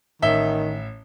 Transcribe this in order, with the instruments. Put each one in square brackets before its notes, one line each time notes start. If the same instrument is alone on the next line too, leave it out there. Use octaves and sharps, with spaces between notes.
[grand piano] A1 E5 G7 [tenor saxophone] D#3